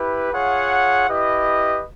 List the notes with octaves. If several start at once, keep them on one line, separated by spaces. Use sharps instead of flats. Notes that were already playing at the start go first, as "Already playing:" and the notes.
Already playing: E4 G4 B4
F4 G#4 C#5 F#5
E4 G4 B4 D#5